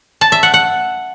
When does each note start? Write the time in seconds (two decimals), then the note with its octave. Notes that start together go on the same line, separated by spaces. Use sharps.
0.21 A5
0.32 E5
0.43 F#5
0.54 F#5